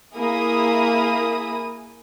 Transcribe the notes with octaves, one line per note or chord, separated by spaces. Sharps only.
A#3 E4 G#4 D#6